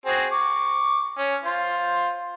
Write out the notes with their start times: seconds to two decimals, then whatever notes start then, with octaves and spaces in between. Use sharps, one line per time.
0.06 C4 F#4 G#4
0.32 C#6 D6
1.18 C#4
1.44 F4 C5